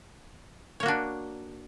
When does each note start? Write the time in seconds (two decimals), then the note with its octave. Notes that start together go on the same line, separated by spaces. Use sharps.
0.80 C#5
0.83 A#3
0.86 F#4
0.88 D4